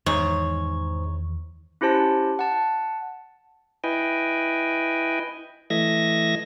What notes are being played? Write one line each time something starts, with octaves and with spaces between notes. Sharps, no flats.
E2 G#2 D#3 E3 C#5
C#4 E4 G4 C5 A5
F#5 A5
E4 B4 D#5 G5 G#5
E3 A3 D#5 E5 G#6 A#6